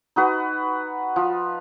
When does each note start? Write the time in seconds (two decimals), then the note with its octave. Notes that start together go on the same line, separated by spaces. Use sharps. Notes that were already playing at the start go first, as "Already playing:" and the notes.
0.16 D#4 F#4 B4
1.16 F3